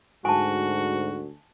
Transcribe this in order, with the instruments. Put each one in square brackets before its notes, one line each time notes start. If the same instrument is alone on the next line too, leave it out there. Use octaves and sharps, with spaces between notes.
[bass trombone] D2 [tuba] G#2 [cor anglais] F#4 [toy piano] G#5 A5